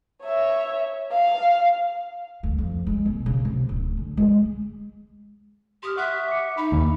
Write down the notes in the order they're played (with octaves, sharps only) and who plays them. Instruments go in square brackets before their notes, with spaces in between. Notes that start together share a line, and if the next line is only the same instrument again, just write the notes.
[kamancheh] C#5 E5
F5
[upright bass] D2
F2
G#3
B2
C#3
C3
D1
D3
G#3
[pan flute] G4 [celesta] C6 D#6 F6
[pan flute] E5 [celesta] F#5 C#6 F#6
[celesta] D6 C#7
[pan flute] D#4 [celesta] B5
[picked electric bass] D#2